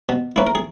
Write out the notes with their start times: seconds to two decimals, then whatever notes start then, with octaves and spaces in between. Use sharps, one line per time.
0.09 B2
0.36 A#3 C#4 E4 B4
0.47 A#4
0.55 G#4